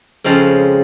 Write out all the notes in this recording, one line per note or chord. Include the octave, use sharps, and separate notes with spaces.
F2 C#3 F3 G#3 C4